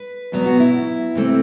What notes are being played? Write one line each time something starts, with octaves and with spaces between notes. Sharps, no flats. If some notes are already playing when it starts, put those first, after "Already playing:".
Already playing: B4
E2 B2 F#3 B3
F#4
E4
C3 E3 A3 C4